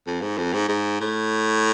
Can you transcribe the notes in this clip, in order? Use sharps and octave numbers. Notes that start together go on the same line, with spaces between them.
F2
G#2
F2
G#2
G#2
A2